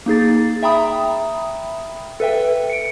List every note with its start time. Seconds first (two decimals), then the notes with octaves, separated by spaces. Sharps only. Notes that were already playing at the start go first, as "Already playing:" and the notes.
0.06 A#3 D#4 G#4 A6
0.63 E5 G5 A#5 B5 D#6
2.20 A4 B4 E5 G5
2.70 C#7 D7